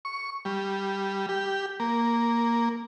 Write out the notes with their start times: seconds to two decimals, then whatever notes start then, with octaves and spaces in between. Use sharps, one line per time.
0.05 C#6
0.45 G3
1.29 G4
1.80 A#3